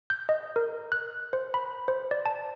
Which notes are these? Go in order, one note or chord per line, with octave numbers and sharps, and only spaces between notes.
G6
D#5
A#4
F#6
C5
B5
C5
D5
A5